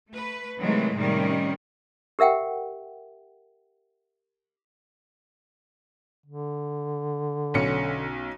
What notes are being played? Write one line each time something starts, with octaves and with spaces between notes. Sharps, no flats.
A3 B4
C3 D#3 E3 F#3 G#3 A3
A2 C3 D#3 G3 C#4
G4 A#4 E5 F#5 G5
D3
B1 C#4 C#7